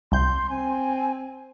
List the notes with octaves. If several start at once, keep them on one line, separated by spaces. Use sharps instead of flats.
C2 C6 G6
C4 G#5